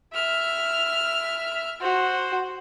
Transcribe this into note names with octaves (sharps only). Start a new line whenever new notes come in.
E5 F6
F#4 C5